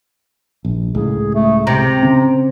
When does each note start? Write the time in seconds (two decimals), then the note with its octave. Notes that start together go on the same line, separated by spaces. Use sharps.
0.65 A#1
0.95 C#2 A2 G#4
1.34 A3
1.67 C3 A#5
2.03 C#3 C4